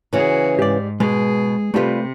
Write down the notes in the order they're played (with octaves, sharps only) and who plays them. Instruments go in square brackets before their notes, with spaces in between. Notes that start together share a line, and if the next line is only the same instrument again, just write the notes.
[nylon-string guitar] C#3 E3 [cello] F#4 G#4
[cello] G#2 [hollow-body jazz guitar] G4 D5
[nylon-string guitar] B2 [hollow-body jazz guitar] G#3 [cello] G#4
[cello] C3 [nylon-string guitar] G3 F4 [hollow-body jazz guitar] A3 G4 B4